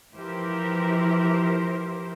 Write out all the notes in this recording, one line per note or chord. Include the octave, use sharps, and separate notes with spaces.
E3 F3 E4 G4 A#4 C5